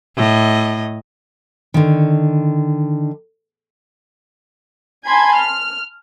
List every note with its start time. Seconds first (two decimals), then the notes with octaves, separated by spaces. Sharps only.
0.17 A2 D#5
1.74 D3 D#3
5.07 G#5 A5 B5 C6 G#6
5.38 F6